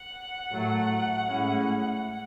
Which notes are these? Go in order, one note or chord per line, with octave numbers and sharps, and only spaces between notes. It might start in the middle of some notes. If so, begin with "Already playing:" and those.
Already playing: F#5
A2 F#3 A3
A2 G#3 C#4 E4